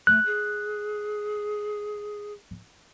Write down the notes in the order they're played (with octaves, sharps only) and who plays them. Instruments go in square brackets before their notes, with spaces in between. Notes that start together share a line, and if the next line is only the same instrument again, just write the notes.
[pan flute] A3 [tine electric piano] F#6
[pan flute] G#4